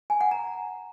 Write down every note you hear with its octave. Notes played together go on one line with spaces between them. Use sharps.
G#5
F#5
A#5